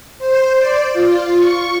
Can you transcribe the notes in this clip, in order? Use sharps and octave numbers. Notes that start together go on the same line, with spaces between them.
C5
D5
F4
C#6